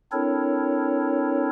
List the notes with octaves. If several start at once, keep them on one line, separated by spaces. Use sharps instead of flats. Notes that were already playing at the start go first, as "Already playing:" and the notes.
C4 D4 E4 A4 A#4 C#5